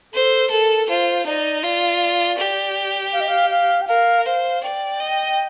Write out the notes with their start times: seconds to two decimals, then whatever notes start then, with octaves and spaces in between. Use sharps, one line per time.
0.13 A4 C5
0.50 A4 A#4
0.88 F4 C5
1.26 D#4 D5
1.63 F4 D5
2.38 G4
3.13 F5
3.21 D#5
3.28 F5
3.50 F5
3.82 G5
3.88 A#4 F5
4.26 C5 F5
4.63 D5 G5
5.00 D#5